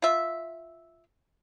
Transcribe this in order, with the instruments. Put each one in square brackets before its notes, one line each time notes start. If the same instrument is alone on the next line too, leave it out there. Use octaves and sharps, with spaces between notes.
[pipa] F4 E5